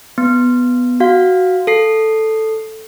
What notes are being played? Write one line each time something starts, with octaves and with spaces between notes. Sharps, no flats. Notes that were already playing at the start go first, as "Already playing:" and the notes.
B3
F#4 F5
A4 C7